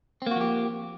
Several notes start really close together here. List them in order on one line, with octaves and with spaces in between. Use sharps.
C4 A#3 F#4 F3 G4